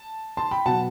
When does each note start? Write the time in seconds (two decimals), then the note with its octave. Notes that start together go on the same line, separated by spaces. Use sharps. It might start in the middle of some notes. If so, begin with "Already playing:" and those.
Already playing: A5
0.37 A5 C6
0.51 G5 B5
0.66 B2 F#3 F#5 A5